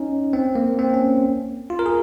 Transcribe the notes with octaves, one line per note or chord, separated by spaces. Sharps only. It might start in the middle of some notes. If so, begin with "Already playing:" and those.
Already playing: C#4 D#4
C4
A#3
C4
C#4
F4
A#4
G#4